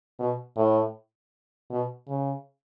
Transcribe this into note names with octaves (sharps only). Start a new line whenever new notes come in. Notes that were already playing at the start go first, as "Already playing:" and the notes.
B2
A2
B2
C#3